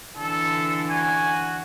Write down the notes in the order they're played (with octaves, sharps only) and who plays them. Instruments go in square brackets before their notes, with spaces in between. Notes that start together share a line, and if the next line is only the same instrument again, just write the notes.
[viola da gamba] D3 E3 [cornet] A4
[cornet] F#4 [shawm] G#5